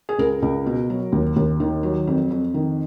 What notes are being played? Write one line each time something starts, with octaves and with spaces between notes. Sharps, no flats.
G#4
C#2 A#4
C#2
B2
F#3
D#2
D#2
D#3
F#3
F2
F2
D#3